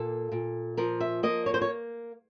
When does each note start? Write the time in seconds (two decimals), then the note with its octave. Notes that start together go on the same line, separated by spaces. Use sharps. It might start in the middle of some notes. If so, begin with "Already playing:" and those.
Already playing: A#2 A#3 A4
0.32 A#2
0.77 F3 A#4
1.00 E5
1.23 A#3 D#5
1.46 C#5
1.54 C5
1.61 C#5